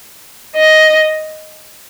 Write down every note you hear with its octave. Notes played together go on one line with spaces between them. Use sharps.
D#5